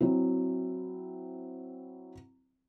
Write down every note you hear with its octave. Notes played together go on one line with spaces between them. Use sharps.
F#3 C4 E4